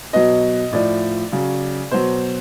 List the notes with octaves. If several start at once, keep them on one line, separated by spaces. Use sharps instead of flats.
B2 F#3 D#5
A2 F3 D5
C#3 F#3
B2 F#3 C5